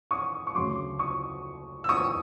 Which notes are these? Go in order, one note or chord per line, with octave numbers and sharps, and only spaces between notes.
C#6 D#6
C#6
D2 C#3 F#3 C6 D6
C#6 D#6
E6
C#6 D#6